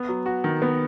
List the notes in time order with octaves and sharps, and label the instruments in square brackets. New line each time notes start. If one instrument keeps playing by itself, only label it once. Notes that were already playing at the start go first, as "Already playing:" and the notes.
Already playing: [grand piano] B3
F#3
F#4
D#3
B3